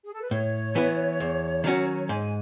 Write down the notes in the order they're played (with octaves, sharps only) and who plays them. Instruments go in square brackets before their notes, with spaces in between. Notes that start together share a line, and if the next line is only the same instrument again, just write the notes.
[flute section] G#4
A4
B4
[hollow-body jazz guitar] A2 [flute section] C#5
[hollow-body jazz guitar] E3 B3 E4 B4
E2
D#3 F#3 C#4 F#4
[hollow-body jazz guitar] G#2 [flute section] G#5